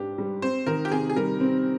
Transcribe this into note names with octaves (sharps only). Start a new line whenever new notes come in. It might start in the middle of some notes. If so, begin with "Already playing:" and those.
Already playing: G#2 D4 G4
G3
C4 C5
D#3 A#4
G4
C3 G#4
G#4
G3 A#4
C4